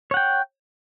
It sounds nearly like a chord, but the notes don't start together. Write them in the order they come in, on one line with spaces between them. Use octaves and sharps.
C#5 F#5 G5